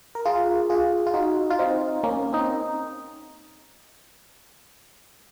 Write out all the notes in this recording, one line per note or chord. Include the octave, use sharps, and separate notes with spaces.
A#4
F4 G#4
F4 G#4
F4
D#4 F#4
F4
C4 D#4
A#3 C#4
C4 D#4